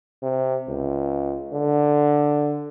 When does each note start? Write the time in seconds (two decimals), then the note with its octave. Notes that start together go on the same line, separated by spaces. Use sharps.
0.22 C3
0.68 C#2
1.53 D3